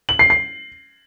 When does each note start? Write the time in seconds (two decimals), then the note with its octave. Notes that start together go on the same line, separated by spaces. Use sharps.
0.09 F#7
0.19 C7
0.30 C7